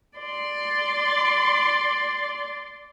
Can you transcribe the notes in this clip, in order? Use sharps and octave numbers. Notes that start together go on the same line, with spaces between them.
D5 C6